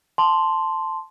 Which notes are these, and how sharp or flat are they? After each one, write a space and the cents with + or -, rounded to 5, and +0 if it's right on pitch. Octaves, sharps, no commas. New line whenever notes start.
A5 +0 C6 +0